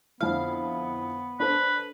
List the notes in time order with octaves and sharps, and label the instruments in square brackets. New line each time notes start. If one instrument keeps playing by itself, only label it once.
[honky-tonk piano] F2 D3 E4 [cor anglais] B3 [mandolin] F5
[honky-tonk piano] D4 A4 C5 [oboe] B4